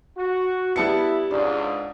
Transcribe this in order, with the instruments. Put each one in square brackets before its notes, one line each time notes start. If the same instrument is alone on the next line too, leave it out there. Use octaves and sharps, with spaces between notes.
[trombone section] F#4
[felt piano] G3 A5 C#7 [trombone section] B3 E4
[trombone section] C#2 G#2 [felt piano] D4